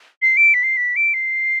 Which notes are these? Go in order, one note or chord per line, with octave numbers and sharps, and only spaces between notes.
C7
D7
B6
C7
B6
D7
C7